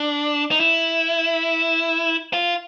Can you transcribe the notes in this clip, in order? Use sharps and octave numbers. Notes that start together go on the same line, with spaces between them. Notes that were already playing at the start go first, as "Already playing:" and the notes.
Already playing: D4
D#4
E4
F4